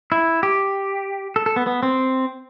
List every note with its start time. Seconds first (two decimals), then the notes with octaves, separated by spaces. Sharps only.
0.12 E4
0.43 G4
1.36 A4
1.46 A4
1.56 B3
1.67 B3
1.83 C4